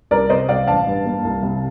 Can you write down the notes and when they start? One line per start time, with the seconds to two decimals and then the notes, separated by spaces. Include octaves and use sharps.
0.11 C2 A#4 D5
0.30 C3 C5 D#5
0.48 C2 D5 F5
0.67 A1 F5 A5
0.87 G2
1.05 A#3
1.24 C2
1.43 C3